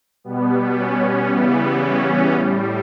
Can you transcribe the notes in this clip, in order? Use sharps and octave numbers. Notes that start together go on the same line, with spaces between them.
B2 G3 B3
C#4
C#3 E3 G3 B3
C#4
A2 G3